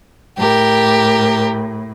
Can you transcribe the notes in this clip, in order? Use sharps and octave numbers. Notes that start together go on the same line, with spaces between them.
A2 G4 A#4